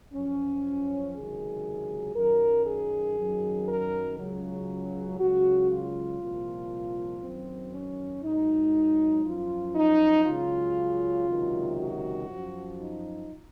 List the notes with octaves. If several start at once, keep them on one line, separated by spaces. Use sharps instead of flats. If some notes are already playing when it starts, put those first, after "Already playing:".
F#2 F3 C#4
C#2 C3 D#3 F#3 G#4
F#2 D#3 F#3 A#4
G#4
F#2 D#3 F#3
A#4
C#2 C#3 F#3
C#2 C#3 F#3 F#4
F4
C2 A#2 F3
F#2 D#3 F#3 C4
C#4
G#2 F#3 D#4
F#2 F3 F4
D#4
C#2 C#3 F#3 F4
C#2 C3 D#3 F#3
F#4
F#2 F3
D#4